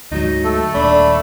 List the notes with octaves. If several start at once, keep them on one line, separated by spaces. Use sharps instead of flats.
D2 G#2 F#3 D#4
A3 A4
D#1 D#2 D4 B5